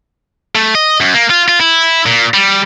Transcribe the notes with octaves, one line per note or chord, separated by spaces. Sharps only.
A3
D#5
F#2
A#3
F4
F4
E4
A#2
G3